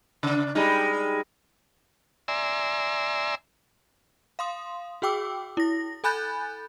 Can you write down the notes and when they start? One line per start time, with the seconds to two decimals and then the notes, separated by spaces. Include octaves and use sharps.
0.23 C#3 D4
0.55 G3 G#3 D#4
2.28 D5 E5 G#5 A#5 C6 E6
4.39 F5 C6 D#6
5.02 F#4 G#4 G5 D6 E6
5.57 E4 A#6
6.04 A4 G#5 B5 F#6 G6 A6